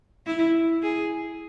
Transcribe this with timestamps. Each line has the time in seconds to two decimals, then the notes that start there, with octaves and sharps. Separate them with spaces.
0.26 E4
0.82 G#4